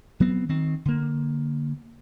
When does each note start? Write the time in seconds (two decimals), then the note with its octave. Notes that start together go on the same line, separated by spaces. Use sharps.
0.20 F#3 B3 C4
0.49 D#3 C4
0.85 D3 A#3